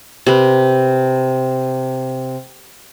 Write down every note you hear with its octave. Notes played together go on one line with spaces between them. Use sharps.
C3 B4